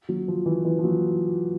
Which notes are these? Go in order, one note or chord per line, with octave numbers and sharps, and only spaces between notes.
F#3
F3
E3
E3
F3
F#3